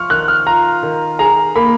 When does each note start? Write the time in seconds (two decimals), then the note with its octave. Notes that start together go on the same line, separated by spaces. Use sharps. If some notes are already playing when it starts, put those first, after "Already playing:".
Already playing: F3 F4 C#6 F6
0.10 D#3 F#6
0.28 F6
0.46 F4 A#5
0.83 D#3
1.19 G#4 A#5
1.56 A#3 B5